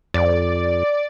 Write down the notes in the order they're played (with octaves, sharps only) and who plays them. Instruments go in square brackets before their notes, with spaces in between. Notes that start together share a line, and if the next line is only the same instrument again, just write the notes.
[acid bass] F2 [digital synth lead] D5